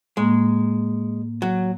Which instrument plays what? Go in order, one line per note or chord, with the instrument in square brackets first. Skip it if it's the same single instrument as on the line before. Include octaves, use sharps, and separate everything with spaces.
[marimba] A2 A#3 [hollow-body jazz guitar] G#3
[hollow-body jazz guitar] F#3